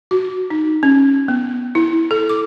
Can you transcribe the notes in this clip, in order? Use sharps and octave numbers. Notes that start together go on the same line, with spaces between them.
F#4
D#4
C#4
B3
E4
A4
D6